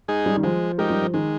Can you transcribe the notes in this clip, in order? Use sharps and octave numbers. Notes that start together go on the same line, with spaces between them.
G#3 D#4 G#4
G3
D#3
F3 G#3
G#3 D#4 G4 A#4
G3
F3
D#3 G#3